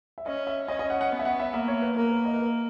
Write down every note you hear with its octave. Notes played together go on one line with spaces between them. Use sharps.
E5
C#4 D#5
E5
C#4 D#5
D#5
F#5
F#5
B3
E5
F#5
E5
A#3 E5
C#5
B4
A#3 A#4
B4
D#5
B4
A#4